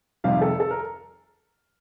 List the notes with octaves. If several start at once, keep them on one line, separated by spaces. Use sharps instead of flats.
F2 C3 D#3 G3 F5
A4
A4
A#4